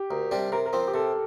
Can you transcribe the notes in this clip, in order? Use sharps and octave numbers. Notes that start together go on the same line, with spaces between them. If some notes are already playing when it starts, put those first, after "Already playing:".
Already playing: G4
D2 A#4
C3 G3 D4 G4
C3 A#4
A#4
F3 C4
G4
C3 A4